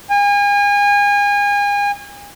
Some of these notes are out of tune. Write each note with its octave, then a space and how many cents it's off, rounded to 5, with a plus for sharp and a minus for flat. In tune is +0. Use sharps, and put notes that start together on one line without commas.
G#5 -35